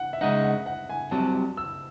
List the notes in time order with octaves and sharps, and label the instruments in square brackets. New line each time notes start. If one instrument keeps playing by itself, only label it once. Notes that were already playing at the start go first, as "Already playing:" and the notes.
Already playing: [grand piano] F#5
E5
[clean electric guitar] C#3 G#3 D#4 [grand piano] F#5
[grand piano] F#5
F#5
G#5
[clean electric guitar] C2 C3 F#3 [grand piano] A5
[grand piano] E6